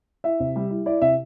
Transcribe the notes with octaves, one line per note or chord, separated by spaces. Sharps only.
E4 E5
C3
G3
E4
E4 D5
C3 E5